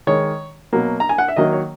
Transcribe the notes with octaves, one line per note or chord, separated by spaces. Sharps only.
D#3 G#3 C#5
B2 F#3 A#3
A#5
G#5
F#5
E5
D#3 F#3 A#3 D#5
C#5